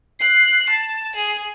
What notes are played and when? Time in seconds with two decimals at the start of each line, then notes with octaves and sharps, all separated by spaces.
0.19 F#6 C7
0.69 A5
1.16 G#4